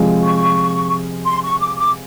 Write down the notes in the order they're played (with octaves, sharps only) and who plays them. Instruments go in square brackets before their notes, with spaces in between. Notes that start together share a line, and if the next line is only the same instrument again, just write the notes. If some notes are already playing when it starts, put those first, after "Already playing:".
Already playing: [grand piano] C3 F3 G#3
[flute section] C#6
C6
C#6
D6
D6